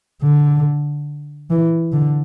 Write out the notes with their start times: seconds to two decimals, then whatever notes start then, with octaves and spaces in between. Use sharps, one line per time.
0.23 D3
1.50 E3
1.92 D3